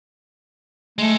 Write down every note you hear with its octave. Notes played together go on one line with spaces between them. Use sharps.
G#3 A3 A4